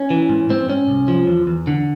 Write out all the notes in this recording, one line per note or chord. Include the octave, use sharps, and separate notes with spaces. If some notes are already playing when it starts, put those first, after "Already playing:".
Already playing: C#4
E3
G#2
G#2 C4
G#2 C#4
C2
F3
E2
E2
D3